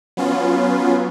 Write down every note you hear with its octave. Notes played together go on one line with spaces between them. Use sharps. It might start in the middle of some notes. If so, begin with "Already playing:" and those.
F#3 B3 C#4 F4